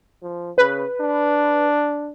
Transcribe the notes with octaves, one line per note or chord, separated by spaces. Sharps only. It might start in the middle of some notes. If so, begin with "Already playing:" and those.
F3
C#3 B4
D4